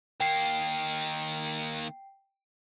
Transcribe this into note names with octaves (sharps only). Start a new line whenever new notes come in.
D#3 A#3 G5 C7